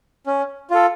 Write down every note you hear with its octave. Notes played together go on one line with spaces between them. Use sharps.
C#4
F4 A4